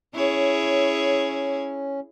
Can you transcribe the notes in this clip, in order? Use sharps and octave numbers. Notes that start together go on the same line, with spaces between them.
C#4 E4 G#4 C#5